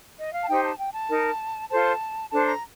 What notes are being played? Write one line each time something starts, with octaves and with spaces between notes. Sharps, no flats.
D#5
F5
A5
D#4 G4 C5 G5
A5
G5
A5
D#4 A#4
F4 A4 C5 A5
D4 A4 C5 A5
A#5